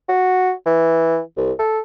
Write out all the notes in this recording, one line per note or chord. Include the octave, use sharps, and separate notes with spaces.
F#4
E3
C2
A4